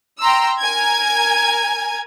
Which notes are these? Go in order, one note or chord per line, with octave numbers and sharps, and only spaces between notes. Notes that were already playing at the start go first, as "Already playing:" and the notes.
G5 A#5 C6 E6
A#4 G#5 G#6